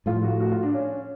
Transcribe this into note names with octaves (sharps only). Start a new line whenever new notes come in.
A2 F3 A3 F4
F#4
F#4
F4
D4
C#4